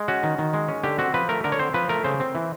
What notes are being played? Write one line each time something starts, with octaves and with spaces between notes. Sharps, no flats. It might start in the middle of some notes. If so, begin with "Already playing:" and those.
Already playing: G#3
C#4 F#4
D#3
D#3
G#3
C#4
D3 G4
C4 F#4
F3 B4
A3 A#4
D3 A#4
C#5
C4 C5
F3 B4
A3 A#4
C#3 C5
C4
E3